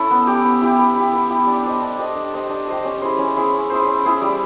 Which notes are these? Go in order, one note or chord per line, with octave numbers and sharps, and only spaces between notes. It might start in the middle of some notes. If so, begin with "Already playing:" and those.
Already playing: C#4 E4 A4
B3
E4 G4
B3
E4 G4
B3
E4 G4
B3
E4 G4
D4
G4 C5 D#5
D4
G4 C5 D#5
D4
G4 C5 D#5
D4
G4 C5 D#5
C#4
E4 G#4 C5
C#4
E4 G#4 C5
C#4
E4 G#4 C5
C#4
E4 G#4 C5
G3